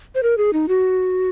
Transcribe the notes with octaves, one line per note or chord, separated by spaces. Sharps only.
C5
A#4
G#4
D#4
F#4